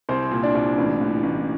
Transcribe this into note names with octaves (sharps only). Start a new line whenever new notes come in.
C2 C4 C5
A#2
D4 D5
C2
A1
A1
A1